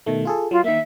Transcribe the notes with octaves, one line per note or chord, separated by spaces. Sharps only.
B2 D#3 A3
F4 G#4 A4
F#3 F4
D#3 A#3 E5